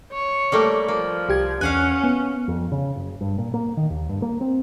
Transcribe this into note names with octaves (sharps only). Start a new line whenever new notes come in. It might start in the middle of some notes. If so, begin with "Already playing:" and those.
C#5
G3 A3 A#3
F3 A#3
C2 G4 G#6
E2 C#4 F5 F#5 G#5 F#6
B3
F2
C#3
F#1
G2
A#2
A#3
D#3
D#2
G2
A#3
C4